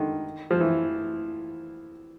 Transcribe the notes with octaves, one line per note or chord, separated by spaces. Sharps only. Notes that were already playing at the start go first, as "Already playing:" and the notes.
Already playing: D3 D#3
F3
E3